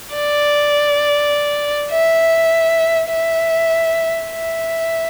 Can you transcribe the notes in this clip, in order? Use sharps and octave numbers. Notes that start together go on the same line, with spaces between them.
D5
E5
E5
E5